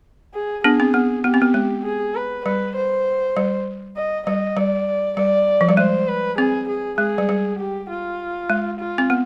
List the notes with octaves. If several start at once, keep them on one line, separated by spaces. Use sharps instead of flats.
G#4
B3 D4 G#4
C4
B3
B3 G4
C4
B3
G#3
G#4
B4
G3 B4
C5
G3
D#5
G3 D#5
G3 D5
G3 D5
F3
G3
G#3 C5
B4
C4 G#4
G#4
G#3 G#4
G3
G3
G4
F4
G#3
F4
C4
B3